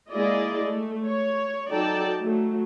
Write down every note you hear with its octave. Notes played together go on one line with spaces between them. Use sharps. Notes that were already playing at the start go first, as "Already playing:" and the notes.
G#3 A#3 E4 G#4 D5 D#5
A3
C#5
F#3 D#4 A4 D5 G5 A5
F#3 A3